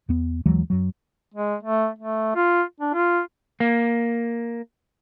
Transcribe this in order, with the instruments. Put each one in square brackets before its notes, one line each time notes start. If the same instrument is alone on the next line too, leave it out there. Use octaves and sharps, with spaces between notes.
[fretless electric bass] E2 B3
D#2 E3 F#3 G#3
F#2 F#3
[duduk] G#3
A3
A3
F4
D4
F4
[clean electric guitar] A#3